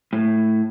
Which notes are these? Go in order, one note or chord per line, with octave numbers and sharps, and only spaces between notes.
A2